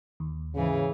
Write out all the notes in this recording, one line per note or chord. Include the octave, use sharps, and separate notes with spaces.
D#2
G#2 C#3 E3